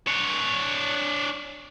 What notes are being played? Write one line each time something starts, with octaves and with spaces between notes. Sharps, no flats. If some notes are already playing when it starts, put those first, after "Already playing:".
D4 C#5